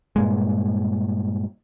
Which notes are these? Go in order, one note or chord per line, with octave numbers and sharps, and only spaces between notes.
G2 A#2 G#3